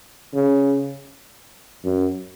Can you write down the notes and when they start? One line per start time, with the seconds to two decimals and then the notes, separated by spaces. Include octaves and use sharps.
0.34 C#3
1.84 F#2